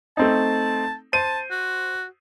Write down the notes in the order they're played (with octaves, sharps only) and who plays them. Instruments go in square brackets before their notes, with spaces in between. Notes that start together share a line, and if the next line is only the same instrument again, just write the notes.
[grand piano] A3 C4 D#4 [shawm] A5
[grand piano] C5 D#7 [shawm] A5
[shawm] F#4